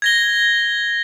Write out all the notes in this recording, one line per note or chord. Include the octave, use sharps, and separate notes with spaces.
G#6 A#6 G7